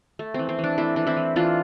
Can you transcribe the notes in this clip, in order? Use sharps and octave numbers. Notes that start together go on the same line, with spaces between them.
A3
E3 C4
C4
E3
D4
A3 C4 E4
E3 D4
C4 E4
E3
E3 D4 F4